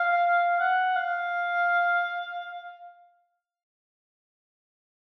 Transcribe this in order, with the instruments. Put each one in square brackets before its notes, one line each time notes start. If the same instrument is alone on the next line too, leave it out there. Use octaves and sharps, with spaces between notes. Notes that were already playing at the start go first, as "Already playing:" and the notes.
Already playing: [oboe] F5
F#5
F5